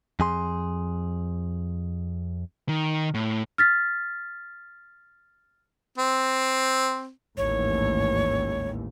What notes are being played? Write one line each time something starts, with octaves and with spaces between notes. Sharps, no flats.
F2 G#4 C6
D#3
A2
F6 A6 B6
C4
A1 D#2 G#2 C#5